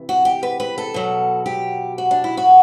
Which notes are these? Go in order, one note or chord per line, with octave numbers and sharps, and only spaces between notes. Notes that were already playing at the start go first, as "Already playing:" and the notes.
Already playing: C3 E3
F#4
G4
B4
B4
A4
B2 F#3
G4
F#4
D4
E4
F#4